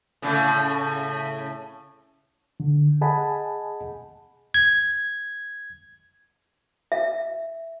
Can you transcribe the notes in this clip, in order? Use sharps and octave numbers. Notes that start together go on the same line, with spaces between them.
A2 C#3
D3
G#4 D#5 F#5 G#5 A5 B5
G#6
E5